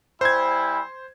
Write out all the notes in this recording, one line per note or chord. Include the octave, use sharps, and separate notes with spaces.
G3 E4 C5 G#5 G#6